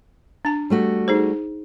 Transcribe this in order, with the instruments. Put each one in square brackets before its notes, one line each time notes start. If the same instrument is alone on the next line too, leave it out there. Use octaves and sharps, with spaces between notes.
[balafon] D4 A5
[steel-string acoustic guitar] G3 A3 F#4
[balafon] D#4 G#4 C5